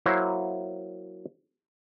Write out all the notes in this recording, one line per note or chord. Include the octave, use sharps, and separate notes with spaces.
F#3 A#3 E4 C5 C#5